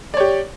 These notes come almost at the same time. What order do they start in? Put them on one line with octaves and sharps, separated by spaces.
D5 C#5 G4